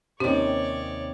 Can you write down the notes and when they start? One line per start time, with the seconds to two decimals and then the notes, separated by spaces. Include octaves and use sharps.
0.20 D#2 C3 C4 C#4 D#4 G4 C#5 D5